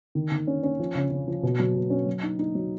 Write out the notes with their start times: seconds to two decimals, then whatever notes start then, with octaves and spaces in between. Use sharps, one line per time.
0.15 D#3
0.32 D#3
0.47 C#4
0.63 C#4
0.80 F3
0.95 C#3
1.11 C#3
1.28 F3
1.43 B2
1.60 F#3
1.75 B2
1.90 C#4
2.06 F#3
2.23 D#4
2.39 D#4
2.55 F#3